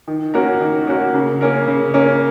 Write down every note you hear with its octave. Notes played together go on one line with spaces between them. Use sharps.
D#3
A#3 C#4 F#4 A#4
D#3
A#3 C#4 F#4 A#4
C#3
A#3 C#4 A#4
C#3
A#3 C#4 A#4